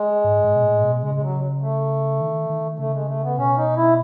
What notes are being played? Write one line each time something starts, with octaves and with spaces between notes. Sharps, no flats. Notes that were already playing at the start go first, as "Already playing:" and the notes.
Already playing: G#3
G#2
G#2
B2
A2
B2
C#3 G#3
G#3
F#3
A3
D#3
D#3
C#3 A3
G#3
A3
B3
B2 C#4
D#4
E4